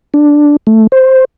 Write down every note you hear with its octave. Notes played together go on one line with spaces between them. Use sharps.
D4
A3
C5